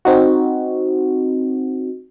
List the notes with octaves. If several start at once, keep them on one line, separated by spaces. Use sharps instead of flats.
C4 D#4 F#4